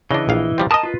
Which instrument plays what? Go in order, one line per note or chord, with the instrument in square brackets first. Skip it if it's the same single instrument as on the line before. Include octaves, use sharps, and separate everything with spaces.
[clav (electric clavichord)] C#3 D4 [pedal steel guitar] E3 D#5
[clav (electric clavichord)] A#1 F5
F3 G3 C4
[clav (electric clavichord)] A#4 D#5 [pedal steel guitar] A5 D#6
[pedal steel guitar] F4 B4